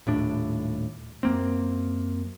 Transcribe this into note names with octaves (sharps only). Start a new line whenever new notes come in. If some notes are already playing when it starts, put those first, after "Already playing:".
D#1 A2 D4
F#2 A#3 C4